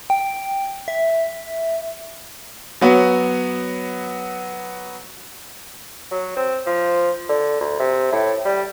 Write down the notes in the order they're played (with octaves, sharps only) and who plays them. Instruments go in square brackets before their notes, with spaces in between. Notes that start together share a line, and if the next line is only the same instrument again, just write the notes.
[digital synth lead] G5
E5
[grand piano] F#3 B3 F#4
[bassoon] F#3
C4
F3
D3
D2
C3
A2
G3